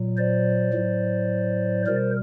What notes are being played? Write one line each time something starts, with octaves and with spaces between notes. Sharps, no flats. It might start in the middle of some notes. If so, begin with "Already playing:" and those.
Already playing: A#2 F#3
C5 D5
A2 F#3
B2 G3 A#4 C5